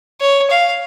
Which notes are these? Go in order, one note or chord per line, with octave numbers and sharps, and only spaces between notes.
C#5
F5